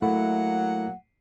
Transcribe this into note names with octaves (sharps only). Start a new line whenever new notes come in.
F#3 A3 A#3 E4 F#5